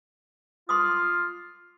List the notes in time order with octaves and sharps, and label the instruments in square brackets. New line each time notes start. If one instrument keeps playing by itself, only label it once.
[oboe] F4 [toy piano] C6 D6 D#6